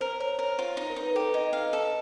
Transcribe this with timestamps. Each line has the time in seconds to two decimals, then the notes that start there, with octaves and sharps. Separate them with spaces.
0.01 A#4 C5
0.20 A#4 C#5
0.38 A#4 C#5
0.58 F4 C5
0.77 D#4
0.90 A#4
0.96 D#4
1.03 B4
1.15 G4 A4
1.34 D#4 D#5
1.53 F5
1.73 A4